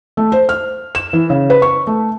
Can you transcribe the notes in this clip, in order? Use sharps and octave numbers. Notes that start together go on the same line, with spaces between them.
A3
C5
F6
E7
E3
C#3
B4
C#6
A3